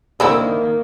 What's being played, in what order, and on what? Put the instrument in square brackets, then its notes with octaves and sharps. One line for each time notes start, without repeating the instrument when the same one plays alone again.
[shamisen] D3 C4 E4 [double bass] D#3 A#3